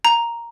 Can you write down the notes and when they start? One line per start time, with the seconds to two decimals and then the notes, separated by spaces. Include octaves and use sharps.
0.05 A#5